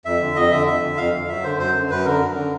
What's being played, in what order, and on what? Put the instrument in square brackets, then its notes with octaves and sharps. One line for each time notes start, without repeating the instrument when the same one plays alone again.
[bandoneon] F2 E5
D3
F2 D#5
D3 E5
F2 E5
D3
F2 F5
D3
F#2 E5
D3 C5
F#2 C5
D3
F#2 B4
D3 A#4
F#2
D3